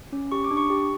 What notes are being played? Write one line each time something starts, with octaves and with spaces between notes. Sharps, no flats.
C#4
G4 C#6
D6
D4
C#6
G4